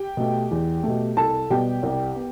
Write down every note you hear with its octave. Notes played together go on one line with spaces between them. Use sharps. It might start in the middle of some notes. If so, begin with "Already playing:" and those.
Already playing: G4 G5
B2 A3
E2
B2 A3
C2 A4 A5
B2 G3 B3 G4 G5
C2
B3